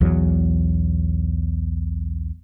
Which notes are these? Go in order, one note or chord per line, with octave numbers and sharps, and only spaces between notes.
B1 E2 F#3